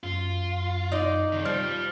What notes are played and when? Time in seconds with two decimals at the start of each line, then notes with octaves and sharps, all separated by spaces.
0.04 F#2 F4
0.92 D#4 D5
1.33 C3 D#3
1.45 F3 G3 F6